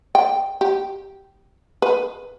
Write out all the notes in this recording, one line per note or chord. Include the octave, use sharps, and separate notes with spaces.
G5
G4
B4